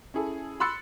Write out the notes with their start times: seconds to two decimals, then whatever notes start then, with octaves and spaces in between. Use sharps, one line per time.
0.14 C#4 E4 G#4 A4
0.60 B5 C6 E6 F#6 A6 C#7